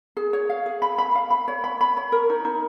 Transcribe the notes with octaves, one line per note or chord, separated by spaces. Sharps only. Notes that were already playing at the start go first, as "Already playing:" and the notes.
G#4
C#5
F5
G#4
B5
B5
F5
B5
C#5
B5
B5
C#5
A#4
D#4
D#4